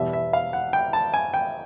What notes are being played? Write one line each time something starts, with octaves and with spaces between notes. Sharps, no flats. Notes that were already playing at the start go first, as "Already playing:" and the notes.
Already playing: E2 B2 G3 E5
E5
F5
F#5
G5
A5
G#5
G5